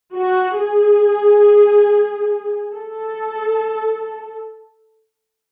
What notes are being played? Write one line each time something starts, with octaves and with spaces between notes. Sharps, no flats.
F#4
G#4
A4